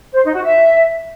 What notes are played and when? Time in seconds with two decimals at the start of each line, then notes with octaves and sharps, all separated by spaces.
0.14 C5
0.24 D#4
0.33 F#4
0.43 E5